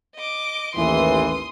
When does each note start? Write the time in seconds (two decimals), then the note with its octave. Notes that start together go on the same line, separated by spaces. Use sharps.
0.16 D#5 D6
0.75 A1 D#2 E3 C6 D#6